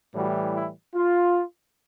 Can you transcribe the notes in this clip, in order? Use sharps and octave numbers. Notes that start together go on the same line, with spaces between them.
A2 E3 G3 F#4
E4
F4